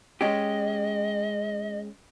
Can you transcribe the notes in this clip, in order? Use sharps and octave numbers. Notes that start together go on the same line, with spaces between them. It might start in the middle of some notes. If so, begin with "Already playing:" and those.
G#3 C#4 G4 D#5